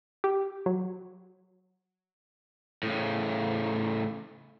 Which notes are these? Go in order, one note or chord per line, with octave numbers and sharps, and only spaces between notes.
G4
F#3
A2 C#3